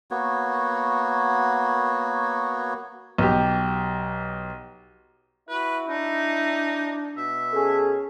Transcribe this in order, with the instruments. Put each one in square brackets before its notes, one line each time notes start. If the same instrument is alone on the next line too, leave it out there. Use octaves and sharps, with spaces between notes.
[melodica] A#3 B3 F#4 C#5
[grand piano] B1 G4
[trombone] E4 [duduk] F#4 [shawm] B4
[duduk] D4 [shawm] D#4
[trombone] B2 [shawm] E5
[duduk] C#4 [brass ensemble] G#4 A4